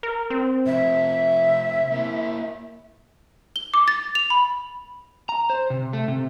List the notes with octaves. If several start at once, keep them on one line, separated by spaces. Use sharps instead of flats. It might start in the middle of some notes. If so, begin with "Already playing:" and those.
A#4
C4
C3 F3 E5
A#3 E4
G7
D6
A6
F7
B5
A#5
C5
C3
A3
C3